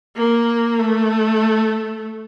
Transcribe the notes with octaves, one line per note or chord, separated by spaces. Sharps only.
A#3
A3